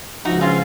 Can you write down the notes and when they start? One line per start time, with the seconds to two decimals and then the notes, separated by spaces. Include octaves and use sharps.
0.25 C#2 C#3 F3 D#4 F#4
0.41 C#4 F4